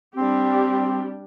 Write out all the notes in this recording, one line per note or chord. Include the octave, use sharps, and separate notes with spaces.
G3 C4 D4 G4